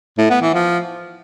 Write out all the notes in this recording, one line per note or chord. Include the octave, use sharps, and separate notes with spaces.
A2
B3
E3
F3